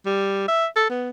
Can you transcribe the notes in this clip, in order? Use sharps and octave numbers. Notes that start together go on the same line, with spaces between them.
G3
E5
A4
B3